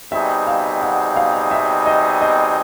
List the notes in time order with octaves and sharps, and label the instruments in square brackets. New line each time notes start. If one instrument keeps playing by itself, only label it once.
[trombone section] B2 G3 C4 D#4 G#4 [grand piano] E5
[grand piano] F5
F#5
F5
E5
D#5
D#5